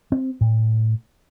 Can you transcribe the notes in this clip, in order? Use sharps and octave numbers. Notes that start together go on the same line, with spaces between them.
C4
A2